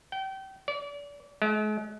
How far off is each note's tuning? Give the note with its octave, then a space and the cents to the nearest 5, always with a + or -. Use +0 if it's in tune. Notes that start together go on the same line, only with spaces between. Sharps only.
G5 -30
D5 -35
G#3 +45